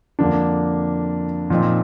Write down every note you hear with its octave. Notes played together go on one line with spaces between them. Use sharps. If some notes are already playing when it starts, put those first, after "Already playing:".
F2 D3 F3 A#3 D4
A#2 F3 C4 D#4